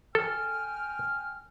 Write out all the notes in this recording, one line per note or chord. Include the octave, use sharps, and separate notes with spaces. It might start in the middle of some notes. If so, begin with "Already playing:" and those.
A4 G5 G#5 F6